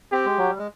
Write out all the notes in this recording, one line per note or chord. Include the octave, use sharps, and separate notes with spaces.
C4 G4
G#3
F#3
G3
G#3